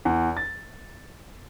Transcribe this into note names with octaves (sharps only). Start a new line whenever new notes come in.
E2
A6